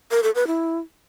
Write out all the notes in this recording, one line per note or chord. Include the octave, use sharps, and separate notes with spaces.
A#4
A4
B4
E4